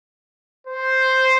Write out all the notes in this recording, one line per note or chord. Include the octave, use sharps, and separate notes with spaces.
C5